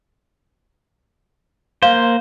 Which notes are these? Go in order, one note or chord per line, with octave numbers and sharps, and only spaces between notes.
A#3 C5 F5